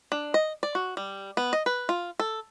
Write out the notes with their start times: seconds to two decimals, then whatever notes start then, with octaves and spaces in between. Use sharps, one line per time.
0.12 D4
0.34 D#5
0.63 D5
0.75 F#4
0.97 G3
1.37 B3
1.53 D#5
1.66 B4
1.89 F4
2.19 A4